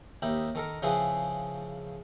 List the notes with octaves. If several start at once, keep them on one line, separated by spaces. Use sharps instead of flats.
D#2 D#4 G4 E5 B5
D#3 A4 A#4
C#3 F3 C4 E4 G#4 B4